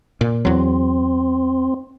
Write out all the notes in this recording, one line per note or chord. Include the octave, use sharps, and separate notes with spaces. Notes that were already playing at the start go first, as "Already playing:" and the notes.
A#2
E2 F#3 C4